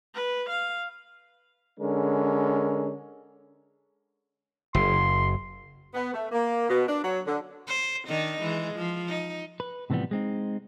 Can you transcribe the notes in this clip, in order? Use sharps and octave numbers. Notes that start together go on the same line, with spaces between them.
B4
F5
D3 G#3 C#4 A#4
F#1 C6
B3
A3
A#3
B2
D4
F#3
D3
C5
D#3 D4 D#4
E3 G#3
F3
D#4
B4
A2 C3 E3 F3 G3 B3
G#3 C4 D#4